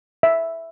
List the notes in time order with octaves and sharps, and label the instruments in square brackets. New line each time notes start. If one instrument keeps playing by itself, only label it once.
[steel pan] E5